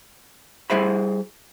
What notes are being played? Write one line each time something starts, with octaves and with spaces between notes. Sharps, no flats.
G3 E4 G#4 C5 E5 B5